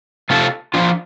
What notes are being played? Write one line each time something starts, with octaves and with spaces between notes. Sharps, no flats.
C3 A3 F4 A4
F3 D4 F4